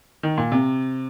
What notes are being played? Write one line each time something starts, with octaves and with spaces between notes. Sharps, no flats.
D#3
A#2
C3